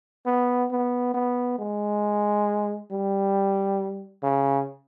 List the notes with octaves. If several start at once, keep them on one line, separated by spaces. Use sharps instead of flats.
B3
B3
B3
G#3
G3
C#3